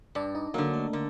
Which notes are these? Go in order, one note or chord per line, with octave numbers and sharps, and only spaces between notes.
G2 D4 D5
D#4 D#5
D3 F#3 A#3 A#4
A3 A4
D3 A#3 A#4